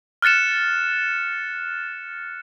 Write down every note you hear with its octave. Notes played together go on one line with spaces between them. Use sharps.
F6 F#6 A6 C#7 E7